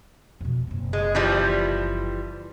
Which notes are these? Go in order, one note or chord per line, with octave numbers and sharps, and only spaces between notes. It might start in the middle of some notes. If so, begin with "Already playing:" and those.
F2 B2
F#1 C4
G#3
E3 F3 G3